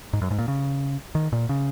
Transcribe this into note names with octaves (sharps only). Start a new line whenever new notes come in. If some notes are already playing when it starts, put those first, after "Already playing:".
G#2
F#2
G#2
A#2
C#3
D#3
A#2
C#3